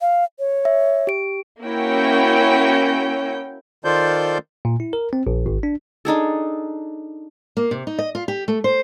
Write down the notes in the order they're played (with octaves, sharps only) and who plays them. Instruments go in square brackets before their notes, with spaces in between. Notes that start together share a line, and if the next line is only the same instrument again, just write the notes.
[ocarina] F5
C#5
[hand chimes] E5
G4 D7
[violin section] A#3 C#4 E4 F#4 G5
[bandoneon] D#3 F4 A4 C5 D5 G6
[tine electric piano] A#2
E4
A#4
C4
A#1
G#1
D4
[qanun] D4 D#4 G#4 A4
[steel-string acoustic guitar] A#3
C3
D#4
D#5
F4
G4
A3
C5